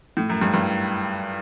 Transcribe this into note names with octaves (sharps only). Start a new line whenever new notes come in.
A2
F#2
G2
G2